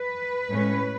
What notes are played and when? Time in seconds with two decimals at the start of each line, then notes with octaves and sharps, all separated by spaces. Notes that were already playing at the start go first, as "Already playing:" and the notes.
Already playing: B4
0.49 A2 G#3 C#4